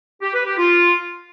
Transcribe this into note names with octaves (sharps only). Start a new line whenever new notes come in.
G4
B4
G4
F4